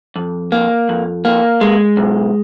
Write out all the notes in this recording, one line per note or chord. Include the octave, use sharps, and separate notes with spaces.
F2
A#3
F2
A#3
G#3
B1